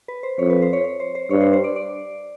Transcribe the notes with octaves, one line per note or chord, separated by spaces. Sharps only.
B4
C5
F2 C#5
B4
C5
C#5
C#5
C5
C5
G2 C#5
C5
C5
D5
D5